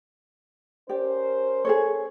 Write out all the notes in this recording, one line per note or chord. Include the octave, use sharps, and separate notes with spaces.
C#4 G4 A#4 C5 D5
G#4 A4 C#5